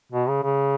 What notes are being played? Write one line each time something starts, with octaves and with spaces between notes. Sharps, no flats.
B2
C#3
C#3